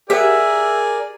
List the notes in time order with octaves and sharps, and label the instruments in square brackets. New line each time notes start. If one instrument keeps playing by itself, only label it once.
[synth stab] G4 F#5 [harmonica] G#4 [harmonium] A#4 D5 [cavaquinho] E5